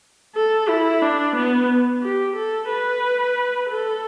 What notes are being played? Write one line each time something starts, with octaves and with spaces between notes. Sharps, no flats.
A4
E4
D4
B3
G4
A4
B4
A4